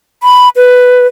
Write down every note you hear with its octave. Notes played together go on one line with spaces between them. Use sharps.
B5
B4